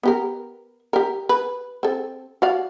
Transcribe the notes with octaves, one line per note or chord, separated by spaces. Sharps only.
B3 G4 A#4
G4 A#4
B4
C4 A4
F#4 D5 F5